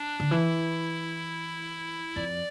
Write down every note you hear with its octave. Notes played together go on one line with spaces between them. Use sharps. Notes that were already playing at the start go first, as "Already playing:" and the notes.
Already playing: D4
D3
E3 E4
F2 D5